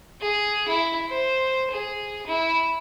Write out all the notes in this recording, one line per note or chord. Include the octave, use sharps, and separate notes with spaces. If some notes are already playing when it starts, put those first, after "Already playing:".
G#4
E4
C5
G#4
E4